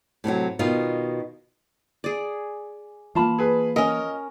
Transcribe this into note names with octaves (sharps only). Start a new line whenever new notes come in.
A2 C3 D#3 F#3
B2 D#3 D#4 F4
G#4 D5
E3 A#3 F4 A5 B5
G#4 B4
C#4 A#4 D#5